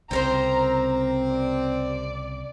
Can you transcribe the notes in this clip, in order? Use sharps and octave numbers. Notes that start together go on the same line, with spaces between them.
C2 C#3 C4 G4 A#4 C5 A#5
D5